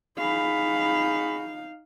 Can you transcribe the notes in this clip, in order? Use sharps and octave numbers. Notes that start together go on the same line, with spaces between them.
D#4 F#4 G#4 F5 B5